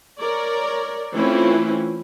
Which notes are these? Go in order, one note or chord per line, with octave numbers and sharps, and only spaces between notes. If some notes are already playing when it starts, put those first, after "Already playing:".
A#4 C#5 D5
E3 A3 C4 C#4 E4 F4